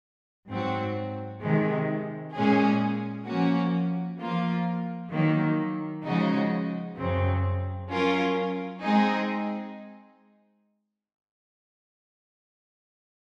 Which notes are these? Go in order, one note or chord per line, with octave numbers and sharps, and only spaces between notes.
G#2 F#3 C4 F#4
C3 D#3 G#3
A#2 G#3 C#4 G#4
F3 A#3 C#4 F#4
F3 A#3 F4
D#3 F#3 A#3
C#3 F3 G#3 D#4 F#4
F#2 C#3 F#3 C4
F#3 C#4 F4 A#4
G#3 C4 D#4 G#4